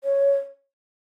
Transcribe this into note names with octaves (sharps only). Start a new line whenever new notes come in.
C#5